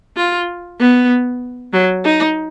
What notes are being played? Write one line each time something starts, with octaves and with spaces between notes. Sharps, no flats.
F4
B3
F#3
D#4